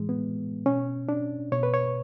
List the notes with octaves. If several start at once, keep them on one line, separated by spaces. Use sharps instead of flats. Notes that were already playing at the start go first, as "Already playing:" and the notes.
Already playing: A2 E3 G#3
B3
B2 C#4
D4
B2 C#5
B4
C#5